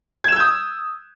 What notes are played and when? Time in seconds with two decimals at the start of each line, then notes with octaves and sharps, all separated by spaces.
0.24 G#6
0.28 E7
0.32 E6
0.36 G6
0.40 D#6